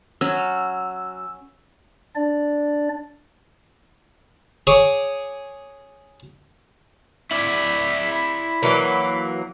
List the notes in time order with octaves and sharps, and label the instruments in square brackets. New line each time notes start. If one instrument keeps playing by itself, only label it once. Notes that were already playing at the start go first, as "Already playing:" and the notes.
[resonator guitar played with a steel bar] F#3 [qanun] C#4 [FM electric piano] E6
[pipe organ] D4 D5
[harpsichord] G#4 C#5 G#5 D6
[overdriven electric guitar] E4 D5 [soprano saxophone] E5
[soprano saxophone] B5
[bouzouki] E3 F#3 A#3